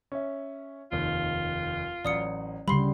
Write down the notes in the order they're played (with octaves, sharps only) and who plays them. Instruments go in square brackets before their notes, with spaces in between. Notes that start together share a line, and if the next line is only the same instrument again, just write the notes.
[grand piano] C#4 C#5 E5
[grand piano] F1 D#2 [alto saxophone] F4
[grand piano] A1 F#3 [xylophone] D5 D#6 C#7
[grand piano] D2 C7 [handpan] C#3 G3 [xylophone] B5 C6